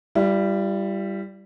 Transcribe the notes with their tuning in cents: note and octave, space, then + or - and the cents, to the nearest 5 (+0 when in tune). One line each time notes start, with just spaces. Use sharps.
G3 +0 E4 +45